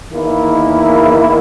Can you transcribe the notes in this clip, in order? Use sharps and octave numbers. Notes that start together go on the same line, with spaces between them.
E2 D#3 A#3 E4